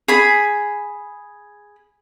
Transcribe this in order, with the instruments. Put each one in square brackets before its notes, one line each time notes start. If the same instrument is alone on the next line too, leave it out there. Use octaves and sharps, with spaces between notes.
[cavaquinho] G#4 B5